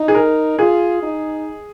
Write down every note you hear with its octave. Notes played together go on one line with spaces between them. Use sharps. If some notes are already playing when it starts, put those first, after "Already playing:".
Already playing: D#4
G#4
A#4
F4 G#4
D#4